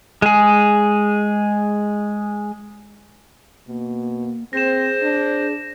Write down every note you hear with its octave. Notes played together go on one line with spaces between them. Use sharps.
G#3 G#4
B2 A#3
C4 G#4 C5 A#6 E7
D4